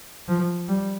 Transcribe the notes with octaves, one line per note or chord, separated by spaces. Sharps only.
F3
G3